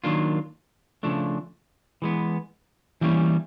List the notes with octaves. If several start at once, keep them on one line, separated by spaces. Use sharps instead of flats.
D#3 F#3 A#3 D4 F4
C#3 F3 A3 D4
E3 G#3 B3
E3 G3 A#3 C#4